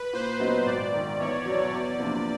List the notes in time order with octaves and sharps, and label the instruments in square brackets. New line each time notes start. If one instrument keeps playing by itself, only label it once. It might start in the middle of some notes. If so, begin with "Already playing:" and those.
Already playing: [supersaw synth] B4
[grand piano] A#2 [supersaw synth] C5
[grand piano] F#3 B3 D#4
[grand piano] G#1 [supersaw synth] D5
[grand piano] G#2 D#3
[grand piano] E2 [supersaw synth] C#5
[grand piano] B2 F#3
[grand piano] E2 [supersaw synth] D5
[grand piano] C3 F3 A#3 D4